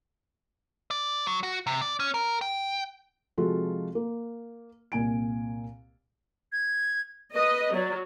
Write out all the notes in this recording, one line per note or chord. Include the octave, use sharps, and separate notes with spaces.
D5
F#3
F#4
C3
D5
C#4
A#4
G5
C3 F3 G#3 F4 F#4 A4
A#3
C2 A#2 G#5 D7
G#6
B4 D#5
F#3 D5